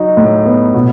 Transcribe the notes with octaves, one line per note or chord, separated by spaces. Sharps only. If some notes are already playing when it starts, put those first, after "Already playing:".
Already playing: F#3 D#4
A2
B3
B2